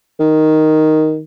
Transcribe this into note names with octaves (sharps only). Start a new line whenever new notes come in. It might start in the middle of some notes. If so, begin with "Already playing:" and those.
D#3